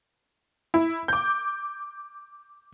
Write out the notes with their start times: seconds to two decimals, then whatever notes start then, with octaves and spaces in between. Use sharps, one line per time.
0.74 E4
1.08 D6 G6